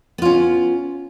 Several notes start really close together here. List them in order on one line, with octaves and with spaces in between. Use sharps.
B3 F4 C#4